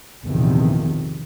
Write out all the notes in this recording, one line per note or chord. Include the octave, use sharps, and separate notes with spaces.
A#1 E2 C3 D#3 F3